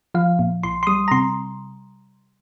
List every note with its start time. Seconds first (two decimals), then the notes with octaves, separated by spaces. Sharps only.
0.14 F3 F5
0.39 A#2
0.63 A#1 C6
0.83 C6
0.87 G3 D#6
1.08 A#5
1.11 C3 C6